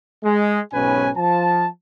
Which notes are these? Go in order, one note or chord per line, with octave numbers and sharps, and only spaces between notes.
G#3
B1 G#2 B2 C#4 B4 G#5
F3 A5